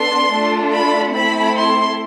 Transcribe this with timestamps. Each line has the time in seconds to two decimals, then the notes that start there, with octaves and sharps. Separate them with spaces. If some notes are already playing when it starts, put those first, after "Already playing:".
Already playing: B3 D4 A4 C6
0.32 A3 D4 F4 A4
0.73 B5
1.14 A3 C4 E4 A4 B5
1.56 C6